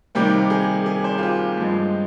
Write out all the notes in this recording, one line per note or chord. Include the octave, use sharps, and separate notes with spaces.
C3 D#3 G3 A#3 G4
G#4
G#4
C5
F4
G4
G4
G2 F3 G#3